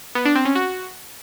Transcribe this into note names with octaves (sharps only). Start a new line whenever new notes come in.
B3
D4
C4
C#4
F#4